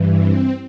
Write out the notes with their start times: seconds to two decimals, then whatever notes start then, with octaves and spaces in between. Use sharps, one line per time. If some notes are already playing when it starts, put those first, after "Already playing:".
Already playing: G2 E3
0.16 C4